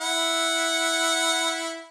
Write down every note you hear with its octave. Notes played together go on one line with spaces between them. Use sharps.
E4 F#5